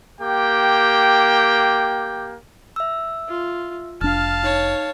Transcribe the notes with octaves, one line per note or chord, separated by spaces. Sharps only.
A#3 G4 G5
E5 E6
F4
F1 D4 F5 A5 F6
D#4 C#5